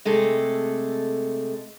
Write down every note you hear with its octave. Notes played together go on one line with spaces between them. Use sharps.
C3 G#3 A3 A4